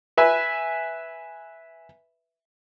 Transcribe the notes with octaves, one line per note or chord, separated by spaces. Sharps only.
B4 E5 G#5